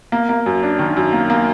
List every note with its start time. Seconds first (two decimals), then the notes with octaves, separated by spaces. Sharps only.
0.12 A#3
0.29 A#3
0.46 F#2
0.63 D4
0.79 D#3
0.97 F#2
1.13 A#3
1.30 A#3